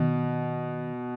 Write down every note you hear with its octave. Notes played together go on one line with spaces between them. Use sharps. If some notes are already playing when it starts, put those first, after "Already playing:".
Already playing: B2 D#3